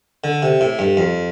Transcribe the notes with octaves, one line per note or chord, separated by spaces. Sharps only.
D3
C3
A2
G2
F2